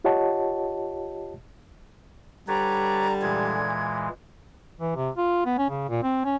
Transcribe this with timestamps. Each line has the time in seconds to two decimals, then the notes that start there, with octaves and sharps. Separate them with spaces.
0.04 F4 G4 C#5 D#5 F#5 A5
2.48 D3 G3 B4 C#5 D5 A#5
3.22 A#2 E3 G#3 G#6
4.80 E3
4.96 C3
5.17 F4
5.45 B3
5.58 C#4
5.70 C#3
5.89 A#2
6.03 C4
6.25 C#4